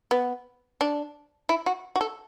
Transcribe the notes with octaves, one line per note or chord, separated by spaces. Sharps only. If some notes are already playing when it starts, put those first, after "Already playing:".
B3
D4
E4
F#4
F#4
A4